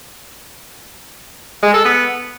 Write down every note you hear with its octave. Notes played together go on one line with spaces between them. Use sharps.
G#3
A4
B3